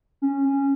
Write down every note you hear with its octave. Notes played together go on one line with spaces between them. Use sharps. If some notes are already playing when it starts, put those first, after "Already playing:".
C#4
C#4